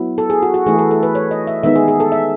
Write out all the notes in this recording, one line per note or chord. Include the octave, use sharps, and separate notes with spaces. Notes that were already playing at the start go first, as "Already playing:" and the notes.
Already playing: F#3 B3 E4
A4
G#4
F#4
F#4
E3 A3 E4 G#4
A4
A4
B4
C#5
D#5
E5
D#3 G#3 B3 D#4 E5
G#4
G#4
A4
E5